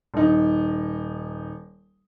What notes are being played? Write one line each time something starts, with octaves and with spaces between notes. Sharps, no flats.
D#1 D#4